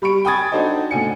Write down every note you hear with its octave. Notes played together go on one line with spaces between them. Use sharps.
G3 B5 C#6 D7
G5 G#5 B5 D#6 G#6 A6
D4 D#4 F#4 A4 C5 D#5
A2 D3 G#5 C#7